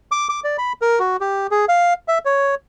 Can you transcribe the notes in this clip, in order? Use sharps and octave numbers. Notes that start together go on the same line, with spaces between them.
D6
D6
D5
B5
A#4
F#4
G4
G#4
F5
E5
C#5